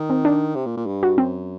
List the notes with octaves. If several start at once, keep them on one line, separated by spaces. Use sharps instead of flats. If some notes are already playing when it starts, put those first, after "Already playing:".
Already playing: D#3
C4
D4
C3
A#2
A#2
G2
F#4
F#2 C4